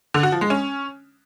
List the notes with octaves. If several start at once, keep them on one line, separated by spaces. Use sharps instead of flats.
D3
F#4
F3
G#3
C#4